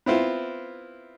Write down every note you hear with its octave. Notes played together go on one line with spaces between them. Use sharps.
B3 C4 E4 F4